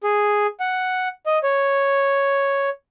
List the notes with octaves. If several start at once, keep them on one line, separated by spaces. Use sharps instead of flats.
G#4
F#5
D#5
C#5